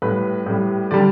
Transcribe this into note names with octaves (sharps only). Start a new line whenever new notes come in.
A2 G3 B4
A2 G3
D3 G3 D5